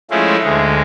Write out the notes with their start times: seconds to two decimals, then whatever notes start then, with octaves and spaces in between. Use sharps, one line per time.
0.11 F3 G#3 A3 C#4 E4 F4
0.44 D2 G#3